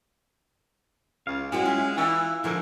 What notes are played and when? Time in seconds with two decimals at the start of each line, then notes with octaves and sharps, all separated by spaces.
1.27 C#2 F5
1.52 G#3 C#4 E4 F#4 C5 G5
1.65 F4 E5
1.97 E3 E4 E6
2.44 G#2 D3 F3 A#4